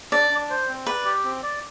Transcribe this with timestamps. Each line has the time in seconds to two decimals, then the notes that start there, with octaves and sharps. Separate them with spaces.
0.12 D4 D5
0.31 D4
0.50 C5
0.68 C4
0.87 B4 D5
1.05 G4
1.24 C4
1.43 D5